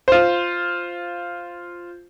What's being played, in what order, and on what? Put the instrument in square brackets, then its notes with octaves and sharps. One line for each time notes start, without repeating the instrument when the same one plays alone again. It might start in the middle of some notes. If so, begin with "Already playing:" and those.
[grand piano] F4 C5